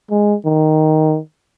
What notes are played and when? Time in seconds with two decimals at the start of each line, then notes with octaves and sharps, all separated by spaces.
0.10 G#3
0.45 D#3